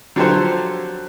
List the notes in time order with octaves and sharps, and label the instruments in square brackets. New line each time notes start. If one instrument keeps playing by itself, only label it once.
[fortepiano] D3 F3 F#3 G4 A4 C5